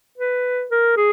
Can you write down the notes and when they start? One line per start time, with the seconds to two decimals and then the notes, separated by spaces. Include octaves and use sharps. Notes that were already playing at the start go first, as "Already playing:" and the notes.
0.18 B4
0.71 A#4
0.97 G#4